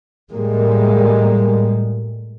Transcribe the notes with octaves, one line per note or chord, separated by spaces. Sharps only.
A2 G3 G#3 A#3